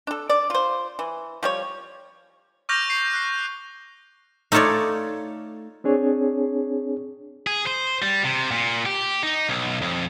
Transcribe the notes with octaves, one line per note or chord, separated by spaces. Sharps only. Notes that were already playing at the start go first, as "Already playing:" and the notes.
D4 A4
D5
F4 C5
E3
F3 G3 C#5
C#6 D6 F6 G6 A#6 F7
C7
F#6 C7
A3 D#4 F4 A4 C#5 D5
C4 D4 G#4 C#5
G#4
C5
G3
C3
A#2
G4
D#4
B1
F2